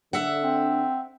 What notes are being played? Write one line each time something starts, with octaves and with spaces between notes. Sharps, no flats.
D3 D4 E5 F#5
C4